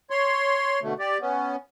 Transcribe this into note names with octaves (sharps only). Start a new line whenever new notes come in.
C#5 C6
B2 D3 A3
G4 D5
B3 C#4